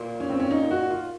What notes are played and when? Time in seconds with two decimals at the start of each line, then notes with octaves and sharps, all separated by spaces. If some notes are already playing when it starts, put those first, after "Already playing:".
Already playing: A#2
0.20 C#4
0.29 C4
0.40 C#4
0.50 D#4
0.71 F#4
0.91 F4